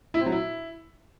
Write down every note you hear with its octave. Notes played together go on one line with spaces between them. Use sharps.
E4
C4
F#3
E4